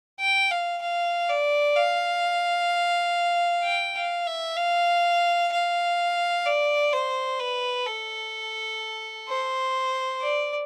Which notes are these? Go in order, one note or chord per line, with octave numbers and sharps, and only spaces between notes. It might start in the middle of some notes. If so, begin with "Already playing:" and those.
G5
F5
F5
D5
F5
G5
F5
E5
F5
F5
D5
C5
B4
A4
C5
D5